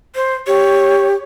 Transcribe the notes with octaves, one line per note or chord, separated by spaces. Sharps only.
C5
G4 C#5